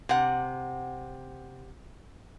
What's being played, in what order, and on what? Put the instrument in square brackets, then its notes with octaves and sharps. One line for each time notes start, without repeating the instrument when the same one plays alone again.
[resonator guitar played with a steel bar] C3 F#5